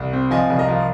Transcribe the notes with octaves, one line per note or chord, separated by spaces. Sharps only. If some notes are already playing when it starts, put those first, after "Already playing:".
Already playing: C2
C4
F3 D#5 G#5
C2
A#4 D#5
F3